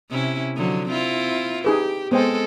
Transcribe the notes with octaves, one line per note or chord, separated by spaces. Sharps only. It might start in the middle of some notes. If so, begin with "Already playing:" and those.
C3 C#4 E4
D3 F3 F#3
C4 E4 F4
D#4 G4 G#4 B4
G#3 B3 C4 A4 C5 G5